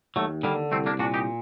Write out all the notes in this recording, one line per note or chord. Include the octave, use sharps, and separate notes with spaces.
D#2 F#3 A3
D3 G3 A#3
C2 A3 C4
A#3 D4
A#2 D4 F#4
D#4 G4